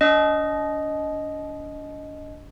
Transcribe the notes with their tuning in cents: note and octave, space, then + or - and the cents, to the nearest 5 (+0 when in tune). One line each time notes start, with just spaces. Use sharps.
D4 -45 D#5 +0